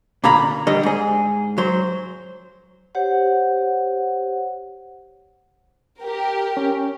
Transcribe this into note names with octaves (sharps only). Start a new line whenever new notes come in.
A#2 D3 A#3 A#5 B5
D3 G3 D#5
G#2 G#4
F#3 C5
G4 C5 C#5 F#5
G4 A#4
C#4